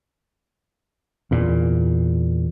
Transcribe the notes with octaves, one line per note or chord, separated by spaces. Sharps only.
E2 A#2